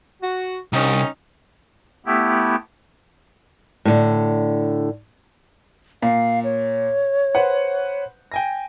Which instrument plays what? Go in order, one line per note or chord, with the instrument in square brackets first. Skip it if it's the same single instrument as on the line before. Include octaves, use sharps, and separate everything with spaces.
[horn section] F#4
[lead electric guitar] C2 [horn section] C#4 D#4
[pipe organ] A3 B3 E4 G4
[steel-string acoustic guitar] A2 D3
[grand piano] A#2 [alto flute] F5
[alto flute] C#5
[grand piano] B4 C5 F#5
G5 G#5 A#6